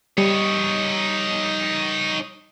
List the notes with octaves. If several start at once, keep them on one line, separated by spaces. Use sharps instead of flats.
G3 D#4 C#5